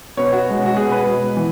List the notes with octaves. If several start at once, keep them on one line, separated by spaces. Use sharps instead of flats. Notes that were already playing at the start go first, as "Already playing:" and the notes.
B2 B3 C#5
F#4
B2 G#3 C#4
F#4
B2 B3 G#4
B4
B2 G#3 B3
E3 B3